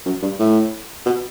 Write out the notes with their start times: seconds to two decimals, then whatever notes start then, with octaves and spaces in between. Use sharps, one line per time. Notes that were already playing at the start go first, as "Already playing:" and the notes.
0.06 F#2
0.22 G2
0.40 A2
1.05 B2